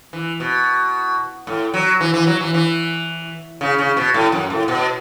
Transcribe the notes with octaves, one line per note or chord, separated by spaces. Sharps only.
E3
B2
A2
F#3
E3
E3
F#3
E3
E3
C#3
C#3
B2
A2
F#2
A2
B2